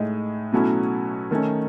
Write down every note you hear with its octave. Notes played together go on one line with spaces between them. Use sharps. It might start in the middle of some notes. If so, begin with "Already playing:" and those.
Already playing: A2 G#3 D#4
B2 F#3 A3 C#4 E4
D#3 A3 C#4